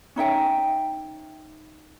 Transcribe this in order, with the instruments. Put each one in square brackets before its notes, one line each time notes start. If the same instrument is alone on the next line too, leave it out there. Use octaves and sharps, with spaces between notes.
[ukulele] C#4 D#4 E5 G5